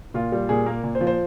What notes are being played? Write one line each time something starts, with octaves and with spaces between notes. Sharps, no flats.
A#2 F4
G3
A#2 G#4
A#3 A#4
A#2
C5
F3
C5